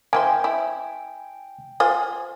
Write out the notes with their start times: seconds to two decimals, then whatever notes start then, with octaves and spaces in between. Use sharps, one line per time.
0.13 A#3 E4 C5 G5 G#5
0.44 E4
1.80 F4 C5 G#5